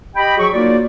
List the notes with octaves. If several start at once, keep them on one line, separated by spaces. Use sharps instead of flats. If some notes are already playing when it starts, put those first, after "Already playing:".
G4 D#5 G5 B5
F3 F#3 F#4 G#4 C#6
A#3 D#4 F4 F#4 C#5 D5